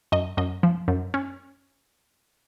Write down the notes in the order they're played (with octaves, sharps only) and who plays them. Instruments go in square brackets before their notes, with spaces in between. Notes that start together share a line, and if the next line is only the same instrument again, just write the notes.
[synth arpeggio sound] F#2 D#5
F#2 D#5
F3
F#2
C#4